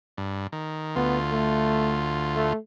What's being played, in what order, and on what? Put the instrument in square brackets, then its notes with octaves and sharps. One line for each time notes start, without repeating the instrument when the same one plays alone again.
[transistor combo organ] G2
D#3
[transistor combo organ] D2 F4 [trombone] B3
[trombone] A3
A3